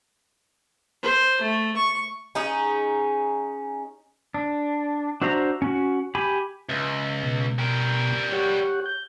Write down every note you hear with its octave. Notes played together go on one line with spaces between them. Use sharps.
C5
A3
C#6
C#4 D#4 G#4
D4
D4 F#4 C5 E5 A#5
C#4 F#4
G4 G#5 B5
C#2 E5
B2
G3 A#4
G4 C#5 F#5
G6